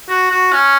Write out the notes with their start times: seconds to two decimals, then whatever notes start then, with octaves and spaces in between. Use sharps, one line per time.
0.09 F#4
0.30 F#4
0.53 C#4